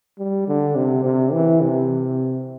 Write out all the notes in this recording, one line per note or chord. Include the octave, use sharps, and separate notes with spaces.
G3
D3
C3
C3
E3
C3